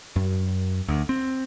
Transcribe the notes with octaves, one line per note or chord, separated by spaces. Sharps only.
F#2
D2
C4